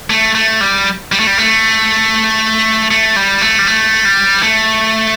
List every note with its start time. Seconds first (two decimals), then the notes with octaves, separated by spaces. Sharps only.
0.10 A3
0.35 A3
0.61 G3
1.12 G3
1.19 A3
1.27 G3
1.38 A3
2.91 A3
3.16 G3
3.41 A3
3.59 G3
3.67 A3
4.05 G3
4.43 A3